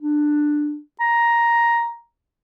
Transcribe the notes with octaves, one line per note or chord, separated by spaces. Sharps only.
D4
A#5